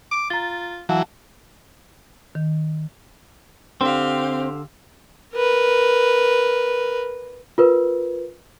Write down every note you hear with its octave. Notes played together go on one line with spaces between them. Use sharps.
D6
F4 A#5 A6
E3 F#3 F5 F#5 A5
D#3
D3 C4 G4 F5 C6 E6
A#4 B4
F4 A#4 B4